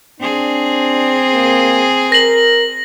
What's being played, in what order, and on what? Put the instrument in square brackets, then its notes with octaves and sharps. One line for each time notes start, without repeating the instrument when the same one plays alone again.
[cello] C4 G#4 [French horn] D4
[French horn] A#3
[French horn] A#4 [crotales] A#6 F#7